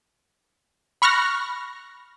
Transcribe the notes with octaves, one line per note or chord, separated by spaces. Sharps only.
B5 C#6 F6 F#6 A#6